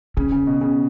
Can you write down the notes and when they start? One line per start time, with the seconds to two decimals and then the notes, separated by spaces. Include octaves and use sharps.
0.17 C#3 C#4
0.32 C#3
0.47 B2
0.61 C#3